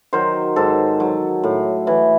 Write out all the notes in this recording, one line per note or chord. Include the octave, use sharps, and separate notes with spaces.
D#3 F#3 C5
G#2 A4
F#3
A2
E3